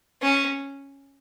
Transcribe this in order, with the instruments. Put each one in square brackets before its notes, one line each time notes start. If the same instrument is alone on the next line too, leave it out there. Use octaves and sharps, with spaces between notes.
[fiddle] C#4